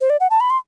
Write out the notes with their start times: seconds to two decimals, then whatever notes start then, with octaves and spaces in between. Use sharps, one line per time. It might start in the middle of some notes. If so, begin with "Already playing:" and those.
0.01 C5
0.10 D5
0.20 F#5
0.30 A5
0.40 B5
0.50 C6